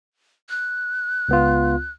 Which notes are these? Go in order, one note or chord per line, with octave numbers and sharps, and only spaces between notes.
F#6
C#2 B3 F4